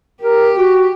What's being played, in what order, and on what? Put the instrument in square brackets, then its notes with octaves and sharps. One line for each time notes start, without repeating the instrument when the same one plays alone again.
[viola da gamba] G4 [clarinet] A#4
[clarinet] F#4